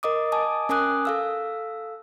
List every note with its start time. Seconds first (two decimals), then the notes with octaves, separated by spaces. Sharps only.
0.03 A#4 D#5 D6 D#6
0.32 G#5 A5 D6 D#6
0.69 C#4 A#4 G#5 D6 D#6 F#6
1.05 A4 F5 E6